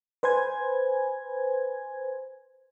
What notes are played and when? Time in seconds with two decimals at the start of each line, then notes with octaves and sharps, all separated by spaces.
0.23 B4 C5 G#5 G#6